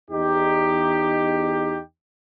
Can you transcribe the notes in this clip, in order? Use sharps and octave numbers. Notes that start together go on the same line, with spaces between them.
E2 D#4 G4